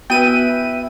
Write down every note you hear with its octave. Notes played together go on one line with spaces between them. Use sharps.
B3 E4 F#4 B4 E5 G5 D#7